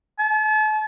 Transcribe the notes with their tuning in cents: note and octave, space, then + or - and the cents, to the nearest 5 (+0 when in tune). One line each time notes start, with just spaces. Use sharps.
A5 -40